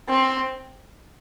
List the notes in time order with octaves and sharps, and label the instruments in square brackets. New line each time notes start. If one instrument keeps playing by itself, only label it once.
[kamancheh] C4